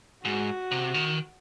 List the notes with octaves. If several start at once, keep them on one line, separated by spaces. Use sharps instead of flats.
G#2 F#4
C3
D#3